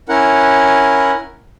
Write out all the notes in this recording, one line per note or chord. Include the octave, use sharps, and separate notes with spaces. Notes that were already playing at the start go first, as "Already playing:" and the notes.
C#4 E4 A#4 F#5